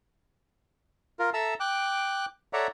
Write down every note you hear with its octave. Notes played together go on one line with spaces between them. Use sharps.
F4 A#4
A4 E5 A5 A#5 E6
G5 D6 F#6
A4 C#5 D5 E5 F#5 A#5